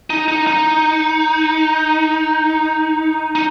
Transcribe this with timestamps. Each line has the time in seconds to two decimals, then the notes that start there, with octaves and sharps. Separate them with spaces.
0.10 D#4
0.28 D#4
0.47 D#4
3.35 D#4